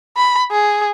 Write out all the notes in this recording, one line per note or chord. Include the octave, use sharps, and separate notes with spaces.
B5
G#4